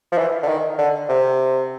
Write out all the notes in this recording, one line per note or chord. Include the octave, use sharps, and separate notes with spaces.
F3
E3
D3
D#3
D3
C3